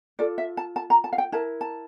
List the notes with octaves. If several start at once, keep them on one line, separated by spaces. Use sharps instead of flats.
F4 A4 D5
E5
A5
A5
A#5
A5
F5
G5
E4 A#4 A5
A5